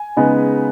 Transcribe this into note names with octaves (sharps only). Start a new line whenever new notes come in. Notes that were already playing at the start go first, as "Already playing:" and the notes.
Already playing: G#5
C#3 G#3 B3 D#4